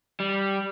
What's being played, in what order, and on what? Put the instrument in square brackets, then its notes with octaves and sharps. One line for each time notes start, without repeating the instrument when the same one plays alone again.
[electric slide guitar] G3